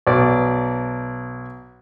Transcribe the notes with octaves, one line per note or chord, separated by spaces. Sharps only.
B1 D5